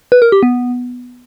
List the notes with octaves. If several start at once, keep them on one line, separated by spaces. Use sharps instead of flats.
B4
A#4
G4
B3